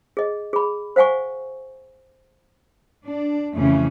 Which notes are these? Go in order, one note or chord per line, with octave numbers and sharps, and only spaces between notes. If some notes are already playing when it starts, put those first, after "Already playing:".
G#4 D#5
G#4 B5
C5 F5 F#5 G#5 C#6
D4
F2 C#3 E3 A3 C#4